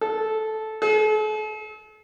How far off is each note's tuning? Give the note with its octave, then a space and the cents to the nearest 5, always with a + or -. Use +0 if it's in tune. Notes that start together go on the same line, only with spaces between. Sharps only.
A4 -10
A4 -45